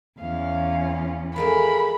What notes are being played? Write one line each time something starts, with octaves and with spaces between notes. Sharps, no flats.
E2 C#4 F5
F3 G#3 A3 A#4 B5